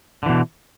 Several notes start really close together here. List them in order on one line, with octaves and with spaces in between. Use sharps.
D3 E3 B2